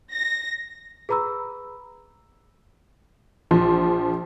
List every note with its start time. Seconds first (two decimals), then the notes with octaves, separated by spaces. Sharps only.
0.11 A#6
1.09 G#4 B4 A#5 B5 E6
3.51 A#1 F3 C6